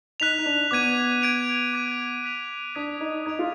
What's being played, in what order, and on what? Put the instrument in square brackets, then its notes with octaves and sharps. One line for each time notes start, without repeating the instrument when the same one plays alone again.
[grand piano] D#4 [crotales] F#6 B6 F7
[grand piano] D#4
D4
[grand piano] B3 [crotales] D6 G#6 D#7
[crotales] G#6 D7 F7
D6 G#6 D#7
F#6 B6 F7
[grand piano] D4 [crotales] D#6 G#6 B6
[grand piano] D#4
[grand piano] D#4 [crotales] G#6 D7 F7
[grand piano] F4